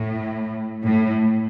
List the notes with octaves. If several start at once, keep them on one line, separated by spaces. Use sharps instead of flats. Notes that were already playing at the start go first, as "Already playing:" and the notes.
Already playing: A2
A2